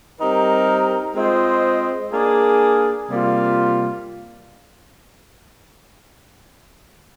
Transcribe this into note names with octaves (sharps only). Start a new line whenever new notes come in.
G3 C4 D#4 G4 A#4
G#3 C4 F4 C5 D#5
A#3 D4 G#4
C3 G3 A#3 F4